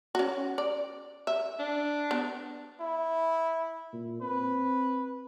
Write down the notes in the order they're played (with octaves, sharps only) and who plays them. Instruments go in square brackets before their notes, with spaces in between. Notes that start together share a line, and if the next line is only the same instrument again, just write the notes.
[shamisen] C#4 F#4
D5
E5
[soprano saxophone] D4
[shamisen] B3
[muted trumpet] E4
[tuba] A#2
[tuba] C4 [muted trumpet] B4